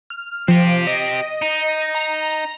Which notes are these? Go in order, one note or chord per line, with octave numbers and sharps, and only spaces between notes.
F6
F3 C4 G4
D#5
D#4
A#5